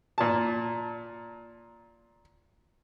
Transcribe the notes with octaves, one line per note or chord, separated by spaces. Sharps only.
A#2 A5